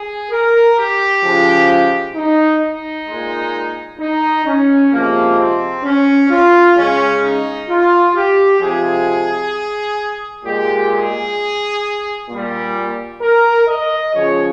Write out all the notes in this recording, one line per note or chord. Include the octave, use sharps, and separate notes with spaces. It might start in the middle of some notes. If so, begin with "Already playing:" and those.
Already playing: G#4
A#4
G4
C#3 F3 G#3
D#4
D#4
A#2 G#3
D#4
C#4
C3 F3 G#3 A#3
C4
C#4
F4
C#3 G#3 C#4
D#4
F4
G4
C3 F3 G#3 G#4
A#2 G#3 G4
G#4
A#2 G3
A#4
D#5
C#3 F3 G#3 C#5